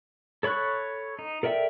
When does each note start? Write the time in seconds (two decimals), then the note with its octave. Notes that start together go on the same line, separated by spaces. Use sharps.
0.43 A4 C#5 B5 C#6 F#6
1.19 D#4
1.43 A4 A#4 D5 E5 G5